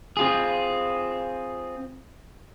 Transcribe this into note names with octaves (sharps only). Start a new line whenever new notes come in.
C4 F4 G#4